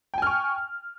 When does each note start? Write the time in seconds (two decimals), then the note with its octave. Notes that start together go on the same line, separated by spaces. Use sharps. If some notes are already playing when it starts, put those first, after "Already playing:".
0.14 G5
0.18 G#5
0.22 F6
0.27 C#6